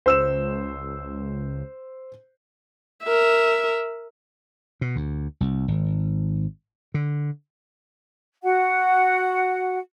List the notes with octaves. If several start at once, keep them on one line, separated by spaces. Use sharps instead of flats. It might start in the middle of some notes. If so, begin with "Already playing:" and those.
C#2 C5 E6 E7
A#4 E5
B2
D2
C2
G#1
D3
F#4 F#5